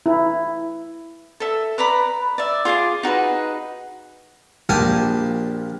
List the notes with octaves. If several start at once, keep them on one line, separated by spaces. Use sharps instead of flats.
E4
A4 E5
B4 D5 A#5 B5
D5 E5
F4 G#4 G#5 D6
D#4 F#4 G#4 B4
A#1 A#2 G4 G#5 A5 D#6